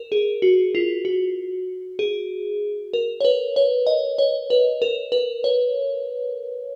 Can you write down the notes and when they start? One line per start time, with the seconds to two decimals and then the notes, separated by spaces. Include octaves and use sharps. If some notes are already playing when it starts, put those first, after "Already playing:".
Already playing: A#4
0.12 G#4
0.42 F#4
0.75 F4
1.05 F#4
1.99 G#4
2.93 A#4
3.20 C#5
3.25 B4
3.56 C#5
3.87 D#5
4.18 C#5
4.50 B4
4.82 A#4
5.12 B4
5.44 C#5